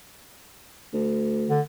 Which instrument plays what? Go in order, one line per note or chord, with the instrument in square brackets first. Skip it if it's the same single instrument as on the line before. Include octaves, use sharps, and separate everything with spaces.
[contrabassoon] D2
[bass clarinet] D3